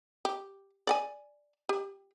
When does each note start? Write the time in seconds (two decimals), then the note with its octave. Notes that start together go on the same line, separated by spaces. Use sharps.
0.25 G4
0.87 D5 F#5 G#5
1.69 G4